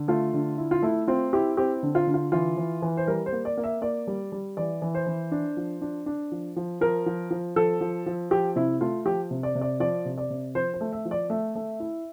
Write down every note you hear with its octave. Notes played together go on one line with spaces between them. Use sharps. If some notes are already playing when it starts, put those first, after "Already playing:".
Already playing: D3
A3 F4
D3
E4
F4
A3 E4
C4 F4
E4 G4
C4 G4
D3
F4
D3
F4
E3 F4
E3
E3
C5
G3 A#4
C5
A#3
D5
A#3
E5
A#3 D5
G3
G3
E3 D5
E3
C5
E3
D4
F3
D4
D4
F3
F3
F3 A#4
F3
F3
F3 A4
F3
F3
F3 G4
C3 E4
A3 F4
F3 G4
C3
D5
C3
D5
F3 D5
C3
D5
C3
F3 C5
C5
A3
E5
F3
D5
A3 E5
A3
E4